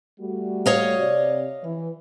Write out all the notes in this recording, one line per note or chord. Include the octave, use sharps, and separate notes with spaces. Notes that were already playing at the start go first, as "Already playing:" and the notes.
G3 A3 F#4
C#5 D#5 F5
C3 D5
E3